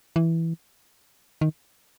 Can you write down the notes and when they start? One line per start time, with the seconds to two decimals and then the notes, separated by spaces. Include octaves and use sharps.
0.16 E3
1.41 D#3